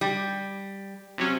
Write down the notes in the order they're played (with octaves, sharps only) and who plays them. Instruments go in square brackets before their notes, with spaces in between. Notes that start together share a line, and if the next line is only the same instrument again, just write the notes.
[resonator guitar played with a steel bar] G3
[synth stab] C3 F#3 C#4